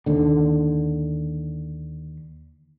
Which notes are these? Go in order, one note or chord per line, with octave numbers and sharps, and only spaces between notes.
D#2 D3